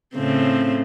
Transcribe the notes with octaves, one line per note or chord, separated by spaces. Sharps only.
A2 C#3 C4